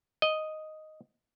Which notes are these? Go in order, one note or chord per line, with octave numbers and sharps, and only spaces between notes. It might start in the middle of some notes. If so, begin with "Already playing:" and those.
D#5